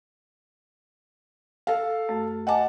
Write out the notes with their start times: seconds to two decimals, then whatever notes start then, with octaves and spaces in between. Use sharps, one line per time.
1.67 A4 F5
2.09 F#2 A3
2.47 D#5 F#5 G#5 A5 D6